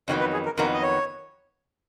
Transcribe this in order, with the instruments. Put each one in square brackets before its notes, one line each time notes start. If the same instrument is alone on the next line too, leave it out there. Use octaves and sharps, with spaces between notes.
[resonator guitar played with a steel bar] F2 D#3 F#3 B3 [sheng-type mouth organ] C#5
[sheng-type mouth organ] B4
G#4
A#4
[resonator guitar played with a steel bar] F2 D#3 F#3 B3 [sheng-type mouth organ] A#4
[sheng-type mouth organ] D#5
C#5